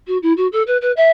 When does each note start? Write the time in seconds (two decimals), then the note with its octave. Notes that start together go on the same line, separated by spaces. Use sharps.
0.07 F#4
0.22 E4
0.37 F#4
0.52 A4
0.66 B4
0.81 B4
0.96 E5